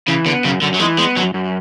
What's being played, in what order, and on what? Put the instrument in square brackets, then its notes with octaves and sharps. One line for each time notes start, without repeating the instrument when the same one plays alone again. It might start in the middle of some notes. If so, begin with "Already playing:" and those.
[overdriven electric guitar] C#3 [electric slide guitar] E3
[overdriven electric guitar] D3 [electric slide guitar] B3
[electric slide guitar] F#2 [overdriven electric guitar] C#3
[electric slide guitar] F#2 [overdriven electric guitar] D3
[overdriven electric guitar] F#3
[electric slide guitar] E3 [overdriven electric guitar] G#3
[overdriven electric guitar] G#3 [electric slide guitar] B3
[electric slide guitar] F#2 [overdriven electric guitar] F#3
[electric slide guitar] F#2